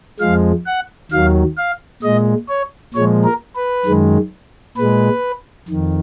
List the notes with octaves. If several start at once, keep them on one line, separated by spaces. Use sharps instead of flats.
F2 F3 G#3 F5
F#5
D#2 D#3 F#3 F5
F5
A#2 G#3 D#5
C#5
A#2 F3 G#3 C#5
A#4
B4
F#2 D#3 G#3
A#2 G#3 B4
F2 D#3